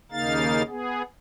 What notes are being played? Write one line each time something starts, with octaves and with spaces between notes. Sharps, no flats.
D#2 C#3 A#3 D#4 F5 A6
B3 G#4